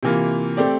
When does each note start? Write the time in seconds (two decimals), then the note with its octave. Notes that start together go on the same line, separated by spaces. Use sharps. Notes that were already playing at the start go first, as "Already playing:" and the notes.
0.03 C3 E3 A#3 F4
0.57 A3 C4 G4 D5